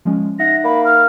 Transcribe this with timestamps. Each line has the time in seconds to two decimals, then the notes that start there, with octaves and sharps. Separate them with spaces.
0.05 F3 G#3 C#4
0.39 D#4 E5 F#5 A#6
0.64 A#3 B5
0.85 F6